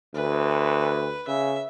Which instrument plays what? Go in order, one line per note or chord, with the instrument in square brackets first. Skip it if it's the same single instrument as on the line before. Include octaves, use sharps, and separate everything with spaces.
[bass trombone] D2 [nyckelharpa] B4
[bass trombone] C#3 [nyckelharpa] E5